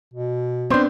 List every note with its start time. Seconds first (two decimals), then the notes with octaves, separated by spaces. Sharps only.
0.14 B2
0.70 B3 C4 D4 C5